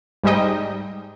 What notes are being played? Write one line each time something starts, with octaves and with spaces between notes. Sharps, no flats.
G#2 G3 G#3 D#4 D#5 G5